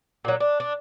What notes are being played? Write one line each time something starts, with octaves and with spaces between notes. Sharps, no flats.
A#2 F#3
D4
D4